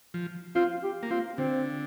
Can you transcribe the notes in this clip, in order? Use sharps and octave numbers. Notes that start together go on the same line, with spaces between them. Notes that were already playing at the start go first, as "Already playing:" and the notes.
F3
C4 F4
G4
A#3
C4 F4
D3 C4